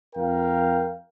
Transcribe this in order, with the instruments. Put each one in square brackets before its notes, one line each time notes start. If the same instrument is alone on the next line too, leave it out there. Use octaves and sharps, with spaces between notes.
[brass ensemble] F2 A#4 F5 G5